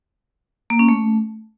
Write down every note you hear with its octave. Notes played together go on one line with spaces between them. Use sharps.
A#3
C#4
A3